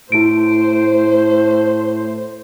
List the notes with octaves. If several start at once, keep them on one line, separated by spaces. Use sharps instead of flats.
A2 E4 C5 D7